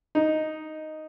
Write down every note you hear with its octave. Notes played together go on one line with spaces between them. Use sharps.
D#4